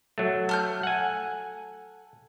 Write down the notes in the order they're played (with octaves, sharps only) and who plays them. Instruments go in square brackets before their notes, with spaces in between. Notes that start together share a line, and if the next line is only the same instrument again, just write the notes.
[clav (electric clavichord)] F#3 A3
[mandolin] A4 F6 G6
[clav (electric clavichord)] F#5 G#5